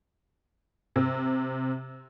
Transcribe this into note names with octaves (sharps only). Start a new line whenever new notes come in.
C3